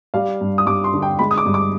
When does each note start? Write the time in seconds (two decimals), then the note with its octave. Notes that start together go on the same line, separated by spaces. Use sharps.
0.14 G3 F5
0.41 G2
0.58 D#6
0.66 G2 D6
0.84 C6
0.94 D3
1.02 G5
1.19 G#3 B5
1.31 D#6
1.38 D6
1.46 G2
1.54 D6